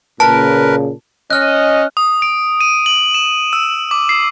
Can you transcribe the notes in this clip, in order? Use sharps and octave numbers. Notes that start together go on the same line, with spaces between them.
A#2 C#3 A#4 B4 A5
C#4 D#5 F6 F#6
D#6
D7
D#7
F#7
E7
E6
D6
C7